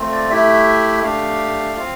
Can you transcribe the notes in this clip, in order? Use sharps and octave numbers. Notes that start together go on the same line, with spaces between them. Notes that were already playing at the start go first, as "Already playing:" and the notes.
Already playing: A3 C4 F4
D5
A3 E4 G4 E5
A3 D4 G4 F5
C4 F4